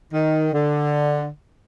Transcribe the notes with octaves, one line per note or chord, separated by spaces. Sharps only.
D#3
D3